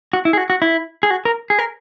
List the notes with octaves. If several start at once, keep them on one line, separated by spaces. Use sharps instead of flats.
F#4
E4
G#4
F#4
F#4
E4
G#4
F#4
A#4
G#4
A#4